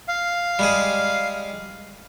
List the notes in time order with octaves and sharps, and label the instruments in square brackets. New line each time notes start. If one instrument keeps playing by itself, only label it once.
[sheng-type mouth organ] F5
[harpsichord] G3 G#3 G#4